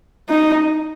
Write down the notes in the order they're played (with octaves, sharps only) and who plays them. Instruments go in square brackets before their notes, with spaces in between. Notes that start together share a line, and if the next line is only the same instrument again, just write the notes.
[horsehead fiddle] D#4